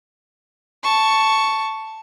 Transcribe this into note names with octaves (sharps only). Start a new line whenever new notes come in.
A5 C#6